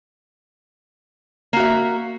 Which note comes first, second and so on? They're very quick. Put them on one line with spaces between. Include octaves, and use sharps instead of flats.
A#3 F#4 E5